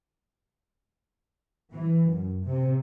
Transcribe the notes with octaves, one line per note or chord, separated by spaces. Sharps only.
E3
F#2
C3